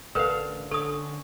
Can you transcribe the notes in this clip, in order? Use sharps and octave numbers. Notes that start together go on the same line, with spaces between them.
A1 D3 A#4 B4 F5 G5
D3 C#4 A4 D#6